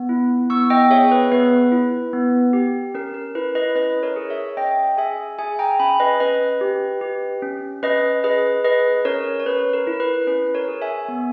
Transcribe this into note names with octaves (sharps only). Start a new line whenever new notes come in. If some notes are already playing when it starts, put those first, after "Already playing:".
Already playing: B3
E4
B3 C#6 E6
D#5 G5
G#4 C#5 E5
B4
B3 B4
E4
B3
G4
C#4 A#4
A#4
E4 B4
B4 D#5
C#4 B4 D#5
A#4 C#5
G#4
C#5 E5
C#4 D#5 G5
G#4 E5 G#5
G#4 E5 G#5
G5 A#5
C#4 G#5 B5
B4 D#5
C#4 B4 D#5
G4
G4
C#4
C#4 B4 D#5
G#4 B4 D#5
G#4 B4 D#5
C#4 A#4 C#5
C#5
C#4 B4
A#4
E4
B4
C#4 B4
A#4 C#5
G#4
E5 G#5
B3